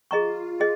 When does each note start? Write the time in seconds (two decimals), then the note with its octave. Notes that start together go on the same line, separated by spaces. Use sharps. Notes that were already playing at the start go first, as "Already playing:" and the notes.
0.11 F4 G#4 D#5 A#5 C#6
0.60 G#4 D#5